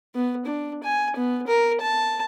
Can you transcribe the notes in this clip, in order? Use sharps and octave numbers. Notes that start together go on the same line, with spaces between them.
B3
D4
G#5
B3
A#4
A5